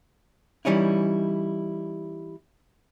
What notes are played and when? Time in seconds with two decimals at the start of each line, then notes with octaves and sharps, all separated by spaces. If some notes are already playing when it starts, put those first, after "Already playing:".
0.65 E3 G3 C#4 D#4 E4